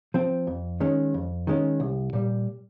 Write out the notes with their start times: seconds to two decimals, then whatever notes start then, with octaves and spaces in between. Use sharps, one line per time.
0.14 F3 C4
0.47 F2
0.80 D#3 G#3 C#4
1.14 F2
1.47 D#3 G#3 C#4
1.80 C2
2.13 A#2 G3